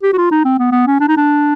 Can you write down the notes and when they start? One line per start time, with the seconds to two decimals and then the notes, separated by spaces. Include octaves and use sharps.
0.03 G4
0.13 F#4
0.18 F4
0.31 D#4
0.45 C4
0.59 B3
0.72 B3
0.87 C#4
1.00 D4
1.08 D#4
1.17 D4